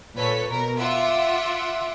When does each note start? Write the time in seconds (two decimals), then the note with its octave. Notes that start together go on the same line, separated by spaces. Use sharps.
0.16 A#2 A4 B4 C#5 B6
0.50 B2 A#4
0.78 F4 E5 F#5 D6